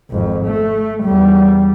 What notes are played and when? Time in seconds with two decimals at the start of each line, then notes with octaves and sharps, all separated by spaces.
0.10 G#1 F2
0.45 A3
1.03 E2 G3